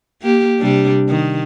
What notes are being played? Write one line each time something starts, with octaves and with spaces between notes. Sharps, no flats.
A#3 G4
C3 G3 D4
D#3